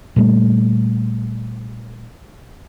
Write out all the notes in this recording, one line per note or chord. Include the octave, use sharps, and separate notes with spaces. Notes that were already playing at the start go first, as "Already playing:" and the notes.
A#2 G3 A3